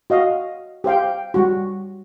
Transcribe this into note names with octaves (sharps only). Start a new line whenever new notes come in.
F#4 D#5 F5
G4 C5 F5 G5
G3 F#4